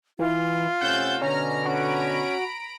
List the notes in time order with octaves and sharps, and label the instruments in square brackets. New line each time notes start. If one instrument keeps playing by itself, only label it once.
[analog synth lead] E3 [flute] F4
[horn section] C3 A3 C#4 [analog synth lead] F#5 [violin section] E6 G6 A6
[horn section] B2 D3 [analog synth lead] C#4 [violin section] A#5 F6
[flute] C#4 [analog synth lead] F#4 [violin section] A#5 B5 D7